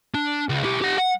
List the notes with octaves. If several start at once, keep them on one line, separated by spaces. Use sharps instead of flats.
D4
C#2
E4 G4
G4 F#5
F#5